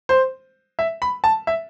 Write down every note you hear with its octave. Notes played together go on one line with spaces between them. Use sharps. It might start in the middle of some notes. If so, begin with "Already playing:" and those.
C5
E5
B5
A5
E5